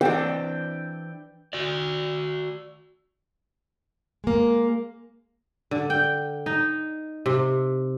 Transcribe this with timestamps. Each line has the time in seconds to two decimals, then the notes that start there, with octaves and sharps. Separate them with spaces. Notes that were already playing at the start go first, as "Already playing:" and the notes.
0.01 E3 C4 D4 G5
1.53 F#4 D5
4.24 G#3 A#3
5.71 D3
5.90 G5
6.46 D#4
7.26 C3